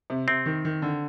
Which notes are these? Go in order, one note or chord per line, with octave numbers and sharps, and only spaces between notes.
C3
C3 C4
D#3
D#3
D3